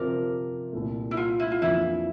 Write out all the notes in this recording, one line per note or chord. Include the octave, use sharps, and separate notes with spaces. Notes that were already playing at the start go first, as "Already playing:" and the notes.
Already playing: C3 F3 C4 G4 A#4 D5
C2 A#2 A3
E4
F4
E4
F4
F2 E3 A#3 D4 E4 F4